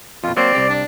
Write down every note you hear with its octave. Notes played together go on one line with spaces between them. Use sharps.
F2 B2 F4
F#3 A#3 C4 C5 D5
C2 G4
D4